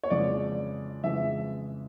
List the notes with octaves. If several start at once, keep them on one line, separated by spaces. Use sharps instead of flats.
C#5
F2 C#3 E3 G#3 D5
F2 C#3 E3 G#3 E5